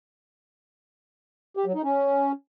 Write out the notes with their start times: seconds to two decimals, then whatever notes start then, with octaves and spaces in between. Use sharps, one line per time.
1.57 G4
1.66 F#3
1.75 D#4
1.84 C#4